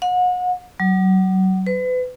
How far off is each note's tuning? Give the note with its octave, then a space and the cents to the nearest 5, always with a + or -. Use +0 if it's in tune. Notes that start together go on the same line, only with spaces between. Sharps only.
F#5 -35
F#3 +30
B4 +35